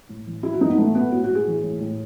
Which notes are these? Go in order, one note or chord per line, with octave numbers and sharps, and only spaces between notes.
A2
E3
E3 E4
F#4
E3 D#4
B3
A2 A3
A2 B3
A2 F#4
F#4
A2
G#4
E3
A2
A2